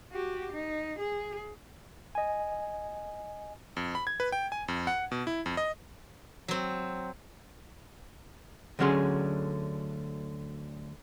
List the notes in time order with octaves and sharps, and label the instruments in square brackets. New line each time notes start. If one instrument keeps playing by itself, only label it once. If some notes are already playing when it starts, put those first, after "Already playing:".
[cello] F#4 G4
D#4
G#4
[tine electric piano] D#5 G#5
[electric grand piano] F2
B5
G#6
B4
G5
G#5
F2
F#5
B2
E4
F2
D#5
[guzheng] F#3 C4
[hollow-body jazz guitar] D2 D3 F#3 C#4 G#4 C6